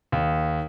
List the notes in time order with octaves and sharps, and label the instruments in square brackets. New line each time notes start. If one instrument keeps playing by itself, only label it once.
[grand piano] D#2